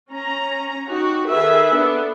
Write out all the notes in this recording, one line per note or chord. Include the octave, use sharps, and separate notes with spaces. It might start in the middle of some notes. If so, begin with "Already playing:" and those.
C#4 A#5
D#4 F#4 G4
D#3 G#4 A4 B4 E5
B3 D4 A4